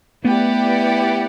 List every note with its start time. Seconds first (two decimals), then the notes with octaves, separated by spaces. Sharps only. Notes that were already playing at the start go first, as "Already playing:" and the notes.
0.24 A3 B3 E4 G4 B4 D5 F#5